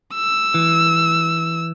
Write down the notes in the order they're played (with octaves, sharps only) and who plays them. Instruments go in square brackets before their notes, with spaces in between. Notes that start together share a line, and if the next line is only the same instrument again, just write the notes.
[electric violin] E6
[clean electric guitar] E3